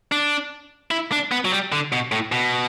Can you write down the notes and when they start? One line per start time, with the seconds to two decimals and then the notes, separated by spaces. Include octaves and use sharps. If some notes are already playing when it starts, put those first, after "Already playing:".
0.12 D4
0.91 E4
1.12 D4
1.32 B3
1.45 F#3
1.52 G3
1.72 D3
1.92 B2
2.12 A2
2.32 B2